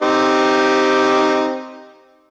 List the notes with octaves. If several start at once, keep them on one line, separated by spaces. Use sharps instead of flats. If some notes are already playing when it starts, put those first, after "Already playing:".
C4 D#4 G4